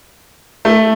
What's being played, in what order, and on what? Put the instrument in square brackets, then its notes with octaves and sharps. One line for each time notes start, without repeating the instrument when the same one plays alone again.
[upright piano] A3